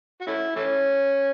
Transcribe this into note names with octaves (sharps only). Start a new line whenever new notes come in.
F#4
A3 C#4 E4
E3 A3 C#4